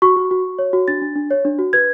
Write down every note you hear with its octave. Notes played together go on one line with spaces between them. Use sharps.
F#4 C#6
F#4
F#4
F#4
C#5
F#4
D4 A6
D4
D4
C#5
D4
F#4
B4 G#6